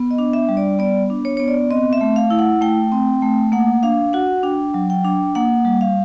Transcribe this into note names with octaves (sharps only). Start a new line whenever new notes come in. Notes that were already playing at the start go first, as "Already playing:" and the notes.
Already playing: B3
D#5
D4
E5
G3
D5
B3 D5
D4
C#5
B3 C#5
D5
C4 D#5
E5
A3
F5
E4
F#5
A3 G5
C4
A3
A#3 F#5
D4 F5
F#4 F#5
D4 G5
F#3
G5
D4
A#3 F#5
G3
F5